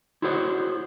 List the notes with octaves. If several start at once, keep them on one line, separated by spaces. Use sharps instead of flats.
E4 F#4 G#4 C5 C#5